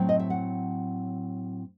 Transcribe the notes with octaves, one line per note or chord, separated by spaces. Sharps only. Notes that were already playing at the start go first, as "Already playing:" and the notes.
Already playing: A2 F#3 C4 G5
D#5
E5
F#5